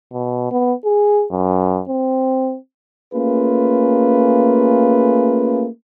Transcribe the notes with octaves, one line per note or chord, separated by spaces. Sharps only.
B2
B3
G#4
F#2
C4
A3 A#3 C#4 F4 G#4 B4